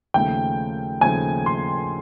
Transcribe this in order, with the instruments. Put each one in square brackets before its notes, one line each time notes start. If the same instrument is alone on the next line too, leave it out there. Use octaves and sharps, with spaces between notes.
[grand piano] D#2 C#3 F3 A3 [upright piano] G5
[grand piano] D#2 C#3 F3 A3 [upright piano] G#5
[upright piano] C6